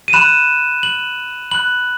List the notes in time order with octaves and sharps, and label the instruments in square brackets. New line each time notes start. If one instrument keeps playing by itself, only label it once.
[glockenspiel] D#7
B5 F#6 E7
F#7
B5 F#6 F#7